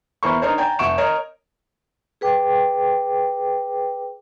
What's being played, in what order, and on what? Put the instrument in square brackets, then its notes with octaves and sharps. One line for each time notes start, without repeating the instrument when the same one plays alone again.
[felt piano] E2 E4 A#4 C5 B5 C#6
D4 D#4 A#4 C5 C#5
D5 G5 G#5 A#5 G6
F1 E5 F#5 C#6 D7 E7
A#4 C#5 D#5
[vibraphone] G#4 B4 G5 D6